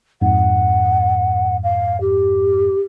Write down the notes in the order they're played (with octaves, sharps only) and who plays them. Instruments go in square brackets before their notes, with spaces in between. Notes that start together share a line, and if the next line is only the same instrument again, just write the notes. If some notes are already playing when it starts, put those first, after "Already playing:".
[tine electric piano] F2 G#2 [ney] F#5
[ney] F5
G4